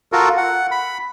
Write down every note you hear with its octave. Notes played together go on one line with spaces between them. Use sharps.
F4 F#4 A4 A#4
F#5
B5